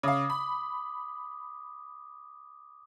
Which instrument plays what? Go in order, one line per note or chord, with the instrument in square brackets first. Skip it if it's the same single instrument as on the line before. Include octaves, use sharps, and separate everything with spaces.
[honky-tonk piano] C#3 F5 [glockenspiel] D6 D#6
[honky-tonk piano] B5